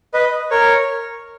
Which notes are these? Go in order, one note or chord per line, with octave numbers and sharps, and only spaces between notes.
B4 D#5
A#4 C#5